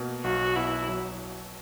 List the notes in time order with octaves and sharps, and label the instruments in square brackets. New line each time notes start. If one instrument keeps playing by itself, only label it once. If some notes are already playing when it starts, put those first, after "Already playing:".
Already playing: [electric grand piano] B2 A#3
[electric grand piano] B1 [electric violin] F#4
[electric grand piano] B2 [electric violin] E4
[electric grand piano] F#3